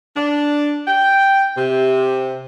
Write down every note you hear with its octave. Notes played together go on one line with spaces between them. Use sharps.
D4
G5
C3